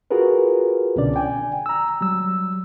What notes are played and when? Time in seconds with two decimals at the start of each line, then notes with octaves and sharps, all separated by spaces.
0.11 F4 F#4 G#4 A#4 B4
0.96 C2 B2 D3 C#4 D4 D5
1.16 G5 G#5
1.66 A#5 E6
2.01 F#3 G3 E6